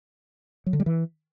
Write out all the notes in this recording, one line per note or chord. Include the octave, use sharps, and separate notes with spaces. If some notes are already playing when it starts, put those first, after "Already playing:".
F#3
D3
G3
E3